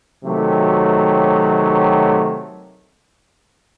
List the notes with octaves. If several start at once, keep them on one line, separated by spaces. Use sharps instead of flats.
C3 D#3 F#3 A3